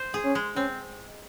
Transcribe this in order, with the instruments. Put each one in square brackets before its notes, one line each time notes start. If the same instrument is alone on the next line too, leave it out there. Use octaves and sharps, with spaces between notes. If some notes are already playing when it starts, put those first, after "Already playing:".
Already playing: [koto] C5
G#4
[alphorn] C#4
[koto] G#3
[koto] C4 [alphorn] C#4